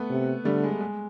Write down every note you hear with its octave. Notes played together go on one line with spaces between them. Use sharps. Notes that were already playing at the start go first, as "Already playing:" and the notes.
Already playing: A3 B3
C3
D3 G3 A3
G#3
G#3